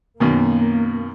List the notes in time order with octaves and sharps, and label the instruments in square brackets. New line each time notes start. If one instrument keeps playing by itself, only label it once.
[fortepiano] F#2 B2 D#3 [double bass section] A#3